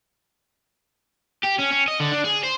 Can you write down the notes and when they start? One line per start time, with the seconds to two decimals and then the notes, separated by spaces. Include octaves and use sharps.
1.43 G4
1.58 C#4
1.72 C#4
1.88 D#5
2.00 D3
2.12 D4
2.24 G#4
2.43 C5